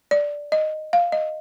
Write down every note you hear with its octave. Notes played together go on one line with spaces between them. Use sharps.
D5
D#5
F5
D#5